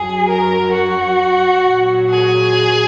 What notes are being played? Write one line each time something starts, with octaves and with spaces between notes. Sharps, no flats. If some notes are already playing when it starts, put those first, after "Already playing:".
Already playing: F#2 F#3 G#4
A#4
F#4
A#2 F#3
G#4